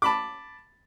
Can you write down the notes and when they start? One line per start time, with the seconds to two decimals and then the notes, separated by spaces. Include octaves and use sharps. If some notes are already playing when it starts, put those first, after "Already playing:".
0.02 A5 B5 D6